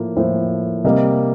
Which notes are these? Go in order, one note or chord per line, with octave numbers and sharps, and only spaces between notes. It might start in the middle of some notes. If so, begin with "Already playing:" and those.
Already playing: A2 F3 A#3
A2 F3 A#3 C5
C3 G3 A#3 D#5